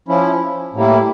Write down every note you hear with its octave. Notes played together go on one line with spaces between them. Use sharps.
F3 C#4 E4
A2 G3 A#3 E4